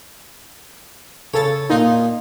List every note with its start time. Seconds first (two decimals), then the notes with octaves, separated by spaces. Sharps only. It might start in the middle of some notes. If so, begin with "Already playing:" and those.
1.34 C#3 A4 C#5 A6
1.70 A#2 D#4 F4